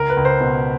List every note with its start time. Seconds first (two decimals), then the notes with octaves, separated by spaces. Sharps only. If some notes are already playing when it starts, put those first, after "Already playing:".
Already playing: C#2 A#4
0.10 B4
0.17 C#2
0.25 C5
0.41 B2